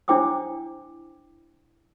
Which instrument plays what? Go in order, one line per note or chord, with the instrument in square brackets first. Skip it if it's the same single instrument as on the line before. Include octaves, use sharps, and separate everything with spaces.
[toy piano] D4 E4 C5 G5 D6 D#6